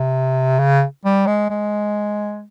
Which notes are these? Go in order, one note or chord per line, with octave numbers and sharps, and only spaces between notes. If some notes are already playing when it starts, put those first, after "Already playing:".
Already playing: C3
C#3
G3
G#3
G#3